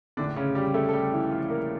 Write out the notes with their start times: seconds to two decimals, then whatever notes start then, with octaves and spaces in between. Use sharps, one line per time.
0.17 A#1 A2 D3 E3 D4
0.36 C#3 C#4
0.55 G3 G4
0.74 A3 A4
0.89 A4
0.93 G3 G4
1.12 E3 E4
1.31 F3 F4
1.50 A#3 A#4